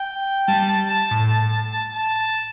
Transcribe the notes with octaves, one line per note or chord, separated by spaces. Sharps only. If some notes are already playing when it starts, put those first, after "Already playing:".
Already playing: G5
G3 A5
A5
A5
A2 A5
A5
A5
A5
A5